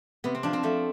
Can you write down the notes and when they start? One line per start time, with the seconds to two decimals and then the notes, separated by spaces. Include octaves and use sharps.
0.24 C3 B3
0.35 C4
0.43 F3 D4
0.53 C4
0.63 F3 A3